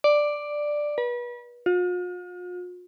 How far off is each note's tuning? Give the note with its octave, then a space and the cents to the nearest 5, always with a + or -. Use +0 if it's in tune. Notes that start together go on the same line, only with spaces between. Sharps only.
D5 +5
B4 -35
F4 +45